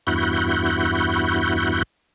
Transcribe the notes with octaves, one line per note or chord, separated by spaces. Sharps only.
E2 G2 E4 F#4 F#6 G6